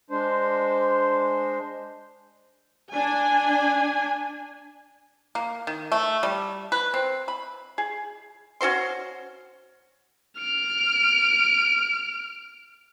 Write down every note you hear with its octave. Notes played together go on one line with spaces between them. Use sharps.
G#3 D4 C5
D4 G#5
A#3
D#3
A3
G3
B4
C4
B5
G#4
C#4 F#4 C5 C6
F6 D7